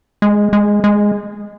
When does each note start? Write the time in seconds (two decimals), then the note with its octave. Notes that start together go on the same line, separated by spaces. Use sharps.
0.22 G#3
0.53 G#3
0.84 G#3